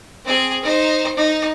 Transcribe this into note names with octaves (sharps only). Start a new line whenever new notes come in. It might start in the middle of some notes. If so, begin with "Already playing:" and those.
C4 G#4
D#4 C5
D#4